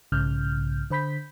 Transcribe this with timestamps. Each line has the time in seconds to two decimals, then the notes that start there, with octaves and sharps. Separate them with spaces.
0.12 B1 G#2 C#3 F6 G6
0.90 D3 C5 B5 G6 B6